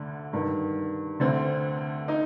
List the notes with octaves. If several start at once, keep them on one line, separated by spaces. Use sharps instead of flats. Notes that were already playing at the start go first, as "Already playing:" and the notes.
Already playing: D2 D3
G2 D#3
D2 D3 C4
D#4